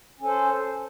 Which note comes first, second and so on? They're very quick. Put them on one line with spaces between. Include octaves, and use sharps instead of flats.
C#4 A4 C5